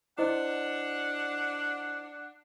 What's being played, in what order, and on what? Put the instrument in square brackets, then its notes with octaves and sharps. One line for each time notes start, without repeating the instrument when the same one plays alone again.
[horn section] D4 F#5 [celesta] E4 C5 D#5